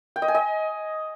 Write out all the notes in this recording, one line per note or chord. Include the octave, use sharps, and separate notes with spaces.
G5
D#5
G#5
D#5